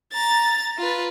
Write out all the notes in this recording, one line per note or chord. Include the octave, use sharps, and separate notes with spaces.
A#5 A6
F4 B4